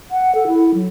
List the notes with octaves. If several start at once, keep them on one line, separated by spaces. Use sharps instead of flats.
F#5
A4
E4
F#3